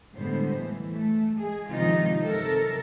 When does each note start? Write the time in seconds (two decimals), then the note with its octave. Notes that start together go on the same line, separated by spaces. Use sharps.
0.14 A2 D3 G3 G#3 B3 C5
0.55 E3
0.91 A3
1.36 G#3 G#4
1.70 C3 D#3 F3 G#3 D#4 F4
2.21 C3 F#3 A4 A#4